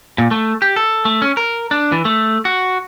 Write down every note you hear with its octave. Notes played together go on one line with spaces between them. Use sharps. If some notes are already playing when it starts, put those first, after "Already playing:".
A#2
A3
G4
A4
A3
C#4
A#4
D4
E3
A3
F#4